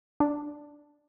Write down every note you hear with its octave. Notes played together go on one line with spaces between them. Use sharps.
D4